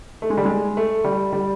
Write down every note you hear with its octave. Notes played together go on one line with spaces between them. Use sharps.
A3
G#3
G3
G#3
A3
G3
G3